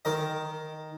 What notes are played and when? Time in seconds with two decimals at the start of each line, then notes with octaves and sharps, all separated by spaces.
0.05 D#3 D#5